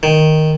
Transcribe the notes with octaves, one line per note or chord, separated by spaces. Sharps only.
D#3